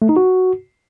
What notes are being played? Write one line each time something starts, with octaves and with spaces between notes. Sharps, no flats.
A3
D#4
F#4